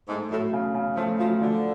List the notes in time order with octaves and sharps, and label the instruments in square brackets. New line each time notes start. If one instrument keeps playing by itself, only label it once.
[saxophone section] G#2 [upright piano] A3
[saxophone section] A2 [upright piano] F#3
[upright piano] C#3
C#3
[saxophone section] F3 [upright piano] A3
[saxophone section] F3 [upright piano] F#3
[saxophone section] D3 [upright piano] F3